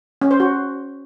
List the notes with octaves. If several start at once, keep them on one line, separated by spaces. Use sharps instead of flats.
C#4
C5
F#4